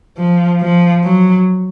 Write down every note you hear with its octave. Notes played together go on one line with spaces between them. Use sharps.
F3
F3
F#3